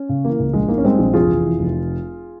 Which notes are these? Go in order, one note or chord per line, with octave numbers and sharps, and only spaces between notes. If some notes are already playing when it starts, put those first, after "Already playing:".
Already playing: C#4
C#3
E3 A#3
C#2
A#1 G#3
G#2 A#3
C#4
G3 G#3 C4
A#1
F1 F4 G#4
E2
E3
F1